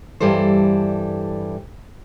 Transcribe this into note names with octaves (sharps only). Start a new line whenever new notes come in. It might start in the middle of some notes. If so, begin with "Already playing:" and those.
G2 E3 G3 A4 C5